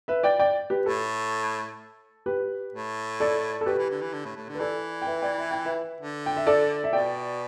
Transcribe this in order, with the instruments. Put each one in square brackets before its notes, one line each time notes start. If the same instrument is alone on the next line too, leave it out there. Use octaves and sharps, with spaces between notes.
[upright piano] B4 E5
D5 G5
D5 G5
G4 B4
[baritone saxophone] A2 [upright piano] A4
[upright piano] G4 B4
[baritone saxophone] A2
[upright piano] A4 D5
A4
[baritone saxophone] B2 [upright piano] G4 B4
[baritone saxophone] E3
D3
E3
D3
A2
A2
D3
[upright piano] B4
[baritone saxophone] E3 [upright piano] A4 D5
[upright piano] G5
B4 E5
D5 G5
E5
G5
B4 E5
[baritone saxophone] D3
[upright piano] G5
E5
A4 D5
E5
[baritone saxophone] B2 [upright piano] D5 G5